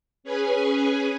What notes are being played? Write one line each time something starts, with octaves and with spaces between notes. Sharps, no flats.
C#4 G#4 B4 G#5